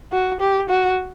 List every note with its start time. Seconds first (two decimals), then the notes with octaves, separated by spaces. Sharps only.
0.12 F#4
0.40 G4
0.69 F#4